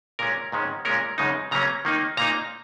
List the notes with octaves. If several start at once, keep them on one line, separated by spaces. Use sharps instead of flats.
A#2 G#3 C#4 A#4
G#2 D#3 G#3 C#4
A#2 G#3 C#4 A#4
F#2 C#3 G#3 D#4
C#3 F#3 A#3 C#4 A#5
D#3 A#3 D#4
A#2 A#3 D#4 A#5